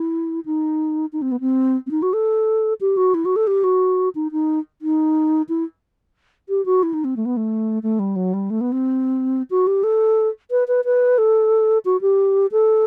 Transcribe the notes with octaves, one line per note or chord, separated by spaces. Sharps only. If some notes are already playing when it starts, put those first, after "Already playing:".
Already playing: E4
D#4
D#4
C4
B3
C4
C4
D#4
F#4
A4
G4
F#4
E4
F#4
A4
G4
F#4
D#4
D#4
D#4
E4
G4
F#4
E4
D#4
C4
A3
B3
A3
A3
G3
F#3
G3
A3
B3
C4
F#4
G4
A4
B4
B4
B4
A4
F#4
G4
A4